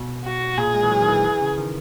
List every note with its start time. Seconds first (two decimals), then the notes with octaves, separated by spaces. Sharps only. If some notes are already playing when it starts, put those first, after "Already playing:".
Already playing: B2
0.25 F#4
0.58 A#2 G#4
0.74 G#3
0.83 E3
0.91 F#3
1.01 D#3
1.08 E3
1.25 E3
1.42 C#3
1.58 D#3